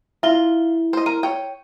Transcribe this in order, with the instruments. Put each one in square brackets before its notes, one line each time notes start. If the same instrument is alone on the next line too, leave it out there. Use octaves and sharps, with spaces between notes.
[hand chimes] E4 [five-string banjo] F4 [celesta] E5 G7
[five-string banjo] C5 D#5
[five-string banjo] A#4 [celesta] D#7
[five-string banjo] C#5 G5